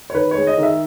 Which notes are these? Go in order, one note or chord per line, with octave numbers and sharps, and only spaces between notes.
C#5
D#3 B4
C#5
G#3
D#5
D#3
E5